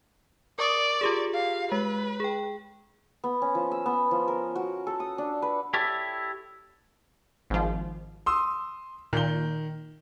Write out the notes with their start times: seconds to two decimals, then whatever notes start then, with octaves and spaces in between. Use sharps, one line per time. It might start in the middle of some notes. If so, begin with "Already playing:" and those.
0.59 A#4 D5 C#6 D#6
1.01 F4 G4 G#4
1.34 F5
1.72 G#3 B4
2.20 G#4 G5
3.24 B3
3.42 C#4
3.55 F3
3.72 E6
3.86 B3
4.11 F3
4.28 A#4
4.55 F#4
4.87 A4
5.00 D#6
5.18 D4
5.42 B4
5.74 E4 G4 A4 C#5 D5 E5
7.50 G#1 F3
8.26 C6 D#6 E6
9.13 A#2 D#3 G7